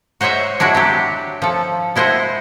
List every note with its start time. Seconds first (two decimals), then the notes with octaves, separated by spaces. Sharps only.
0.21 F#4 C5 C#5 D#5 E5
0.60 G#3 D4 E4 F#4
0.75 F#3 D4 G4
1.42 F3 A4
1.95 G#3 E4 C5 D#5 F#5